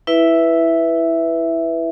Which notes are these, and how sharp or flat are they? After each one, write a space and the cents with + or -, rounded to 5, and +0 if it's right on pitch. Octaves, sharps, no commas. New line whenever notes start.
E4 +0 B4 +0 E5 +0